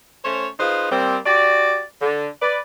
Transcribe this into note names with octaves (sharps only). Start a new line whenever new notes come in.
A3 C#4 C5 C#5
D#4 F4 G#4 B4 C5
G3 A#3 C4
F#4 G4 D5
D3
B4 D5